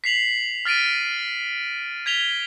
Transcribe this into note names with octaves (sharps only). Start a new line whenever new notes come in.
B6 C7 F7 F#7
F6 A6 B6 D7 D#7
G#6 B6 F7 G7